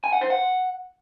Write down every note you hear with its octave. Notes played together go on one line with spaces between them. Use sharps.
G#5
F#5
C5
F#5